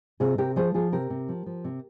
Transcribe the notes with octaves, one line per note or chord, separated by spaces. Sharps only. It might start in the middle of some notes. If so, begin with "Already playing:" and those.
C3 F4 G#4
C3 G4 A#4
F3 G#4 C5
F3 F4 G#4
C3 G4 A#4
C3
F3
F3
C3